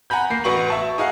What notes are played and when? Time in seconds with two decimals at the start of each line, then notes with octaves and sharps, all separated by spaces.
0.10 F#5 G#5 A#5 B5 G6
0.30 A#3 C7
0.44 A1 F#4 B4 C#6 F#7
0.68 E5 A5 C#6
0.98 D#4 G#4 F5 F#5